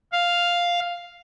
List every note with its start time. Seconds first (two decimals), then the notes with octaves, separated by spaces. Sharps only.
0.13 F5